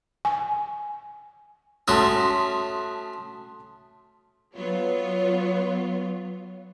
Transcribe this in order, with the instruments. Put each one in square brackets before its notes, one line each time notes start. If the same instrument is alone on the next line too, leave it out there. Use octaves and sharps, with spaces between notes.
[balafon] G#5
[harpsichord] A3 C#4 F#4 [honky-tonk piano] A5 C6 D#6
[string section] F#3 B3 F4 C#5